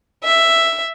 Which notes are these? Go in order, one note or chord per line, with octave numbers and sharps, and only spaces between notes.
E5